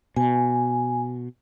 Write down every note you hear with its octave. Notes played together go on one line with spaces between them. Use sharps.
B2 G#5